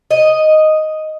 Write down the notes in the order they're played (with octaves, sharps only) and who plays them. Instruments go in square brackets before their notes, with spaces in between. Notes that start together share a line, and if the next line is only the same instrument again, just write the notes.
[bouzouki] D#5